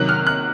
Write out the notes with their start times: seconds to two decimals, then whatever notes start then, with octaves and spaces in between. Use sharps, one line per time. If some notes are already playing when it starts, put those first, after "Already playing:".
Already playing: C3 D#3 F#3 F#6
0.09 F6
0.27 F#6